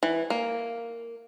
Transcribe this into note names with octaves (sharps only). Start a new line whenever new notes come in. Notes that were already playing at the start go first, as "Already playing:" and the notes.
E3
A#3